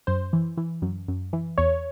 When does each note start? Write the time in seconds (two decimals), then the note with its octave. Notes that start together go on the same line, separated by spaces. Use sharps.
0.07 F#2 C5
0.33 E3
0.57 E3
0.82 F#2
1.08 F#2
1.33 E3
1.58 E2 C#5